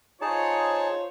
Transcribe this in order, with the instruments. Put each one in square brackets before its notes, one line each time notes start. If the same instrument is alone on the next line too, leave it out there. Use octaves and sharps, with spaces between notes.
[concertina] D#4 G#4 A5 [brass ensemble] F4 C5 C#5